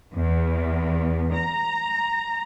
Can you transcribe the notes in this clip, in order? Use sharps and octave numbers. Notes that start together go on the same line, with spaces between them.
E2
A#5